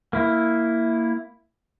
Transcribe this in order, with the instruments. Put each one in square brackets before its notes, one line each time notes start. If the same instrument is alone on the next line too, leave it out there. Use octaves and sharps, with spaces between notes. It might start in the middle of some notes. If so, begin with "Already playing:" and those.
[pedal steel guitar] A#3 E4